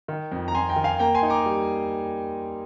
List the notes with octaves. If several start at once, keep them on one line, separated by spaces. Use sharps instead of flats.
D#3
F2
A#5
F2 G#5 C6
G5 A#5
D#3
F5 G#5
A#3 G5 A#5
G#5 C6
D#4
A#5 D6
G3